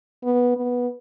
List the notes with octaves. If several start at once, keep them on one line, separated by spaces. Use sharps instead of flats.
B3
B3